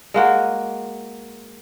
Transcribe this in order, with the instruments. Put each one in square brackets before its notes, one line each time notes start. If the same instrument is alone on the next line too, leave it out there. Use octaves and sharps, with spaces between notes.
[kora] G#3 A#3 F#4